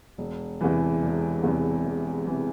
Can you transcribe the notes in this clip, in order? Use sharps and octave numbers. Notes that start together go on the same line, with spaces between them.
E1
E2 C3 E3
E1
E2 C3 E3
E1
C3 E3